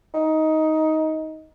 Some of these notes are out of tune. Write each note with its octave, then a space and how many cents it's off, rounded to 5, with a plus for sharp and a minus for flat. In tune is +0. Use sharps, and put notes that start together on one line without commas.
D#4 +15